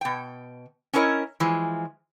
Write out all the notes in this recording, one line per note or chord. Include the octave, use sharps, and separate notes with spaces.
B2 G5
C#4 D4 E4 A#4 C#5 D#5
E3 F3 G#3